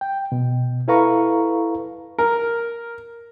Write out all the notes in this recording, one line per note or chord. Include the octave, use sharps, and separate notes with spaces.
G5
B2
E4 A4 B4 F5 A#5 C#6
A#4